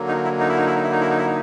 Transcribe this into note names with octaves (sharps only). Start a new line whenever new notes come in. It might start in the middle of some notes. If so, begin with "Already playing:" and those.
Already playing: D3 F#3 A#3
D#4
E4
D#4
E4
D#4
E4
D#4
E4
D#4
E4
D#4
E4
D#4